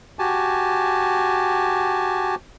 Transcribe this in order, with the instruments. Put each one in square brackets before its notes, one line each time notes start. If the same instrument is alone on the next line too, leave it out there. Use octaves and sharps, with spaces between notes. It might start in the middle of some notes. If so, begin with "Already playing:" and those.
[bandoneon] F#4 G4 G#5 A5